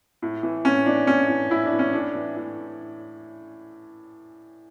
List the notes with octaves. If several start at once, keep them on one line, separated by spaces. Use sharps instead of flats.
A2
E3
A2 C#4
E3 D4
A2 C#4
E3
A2 E4
D4
E3
C#4
A2 D4
E3
A2